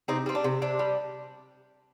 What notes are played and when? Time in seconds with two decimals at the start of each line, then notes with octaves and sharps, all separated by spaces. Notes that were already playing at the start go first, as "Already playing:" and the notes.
0.08 C3 C4 D#4
0.26 G3 C4
0.35 D4
0.44 C3
0.62 C3 D4
0.79 G3